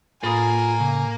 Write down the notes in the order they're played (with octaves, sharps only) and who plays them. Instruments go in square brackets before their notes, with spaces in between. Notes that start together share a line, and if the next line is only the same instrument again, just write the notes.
[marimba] A2 B5 D#6 [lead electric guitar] A#3 A#4 [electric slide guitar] F4 G#4 [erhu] G#5
[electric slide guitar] C#3